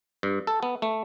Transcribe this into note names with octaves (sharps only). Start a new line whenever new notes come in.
G2
A4
B3
A3